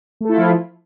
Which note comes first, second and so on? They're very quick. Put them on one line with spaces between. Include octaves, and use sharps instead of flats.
A3 A4 E4 F4 F3